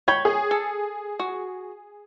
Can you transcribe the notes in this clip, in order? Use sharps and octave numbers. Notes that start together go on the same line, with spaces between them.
C#5 G5 B5 G#6
G#4
A4
F#4